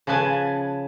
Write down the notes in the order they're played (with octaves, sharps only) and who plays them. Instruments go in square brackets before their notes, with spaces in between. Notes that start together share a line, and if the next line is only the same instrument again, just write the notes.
[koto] C#3 F3 B4 G#5 A5